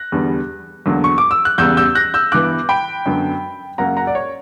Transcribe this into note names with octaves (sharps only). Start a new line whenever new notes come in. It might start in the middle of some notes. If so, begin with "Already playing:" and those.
Already playing: F#6 A#6
E2 D3 G3 B3
E2 D3 F#3 A#3
C#6
D6
E6
F#6
E2 C#3 G3 E6 G6
E6 G6
F#6 A#6
E6 G6
G2 E3 B3 D6 F#6
G5 B5
F#2 D3 F#3 B3
F#2 C#3 F#3 A#3 F#5 A#5
F#5 A#5
D5
C#5